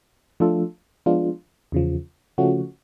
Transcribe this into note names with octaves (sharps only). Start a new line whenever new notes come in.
F3 A3 D4 F4 A4
F3 G#3 B3 D4 F4
E2 C#3 F3
C#3 F3 A3 C#4 F#4